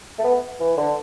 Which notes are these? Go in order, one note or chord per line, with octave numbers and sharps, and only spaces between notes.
A3
B3
E3
D3